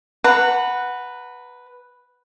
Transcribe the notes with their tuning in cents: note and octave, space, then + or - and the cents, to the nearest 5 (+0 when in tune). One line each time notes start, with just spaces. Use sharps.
B4 +0 F#5 +0 A#5 -30